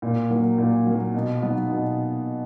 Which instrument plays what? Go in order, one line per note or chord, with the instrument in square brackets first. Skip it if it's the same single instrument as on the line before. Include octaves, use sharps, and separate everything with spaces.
[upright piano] A#2
F#3 A#3
A#2
F#3 A#3
B2
F#3 B3 D#4
B2